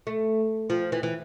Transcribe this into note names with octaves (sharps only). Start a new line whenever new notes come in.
A3
F3
E3
E3